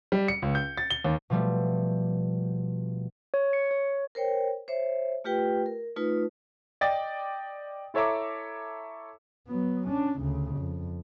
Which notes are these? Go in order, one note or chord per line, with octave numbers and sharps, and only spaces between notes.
G3
C#7
C#2
G6
A6
G7
D#2
B2 F3 G3 A3
C#5
C#7
C#5
A#4 C5 C#5 G5
C5 C#5 E5
A3 F4 G4 B4 G5
A#4
A3 D#4 F4 B4
D5 D#5 G5 A6
E4 A4 C#5 E5 A#5 D6
F#3 B3
C#4 D4
D2 C#3
F2